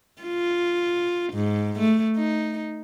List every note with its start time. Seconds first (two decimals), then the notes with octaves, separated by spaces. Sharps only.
0.22 F4
1.33 G#2
1.79 A3
2.17 D#4